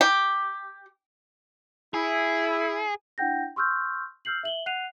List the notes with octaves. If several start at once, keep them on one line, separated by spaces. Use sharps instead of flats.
G4
E4 G#4
D4 E4 F#5 G5 G6 A#6
C6 C#6 E6 F6 G6
E6 F6 G6 C7 F#7
E5 F#7 G7
F#5 F#6 C7 D#7 F7